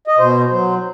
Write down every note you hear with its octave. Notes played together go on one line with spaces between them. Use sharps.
D#5
B2 C5
F#3 C5